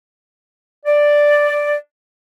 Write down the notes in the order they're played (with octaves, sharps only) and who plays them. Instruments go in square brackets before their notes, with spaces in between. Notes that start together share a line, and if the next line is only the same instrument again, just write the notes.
[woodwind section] D5